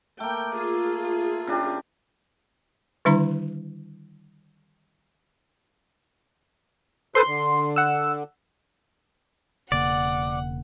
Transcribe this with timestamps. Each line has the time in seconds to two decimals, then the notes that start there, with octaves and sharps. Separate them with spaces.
0.20 A3 A#3 G5
0.53 F4 G#4
1.47 C#3 D4 G4
3.05 D3 D#3 G3 D4 E4 A#5
7.15 A4 B4 C5 C6
7.27 D3
7.76 F#5 E6
9.72 E1 C#3 A#3 D5 F#5